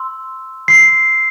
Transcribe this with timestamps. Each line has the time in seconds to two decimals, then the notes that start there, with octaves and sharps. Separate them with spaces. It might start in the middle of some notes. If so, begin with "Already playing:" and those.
Already playing: C6 E6
0.68 C6 E6 C7